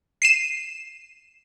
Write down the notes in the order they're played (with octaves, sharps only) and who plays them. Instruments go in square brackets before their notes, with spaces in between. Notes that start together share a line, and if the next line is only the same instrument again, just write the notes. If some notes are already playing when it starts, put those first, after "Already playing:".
[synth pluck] C7 D#7 E7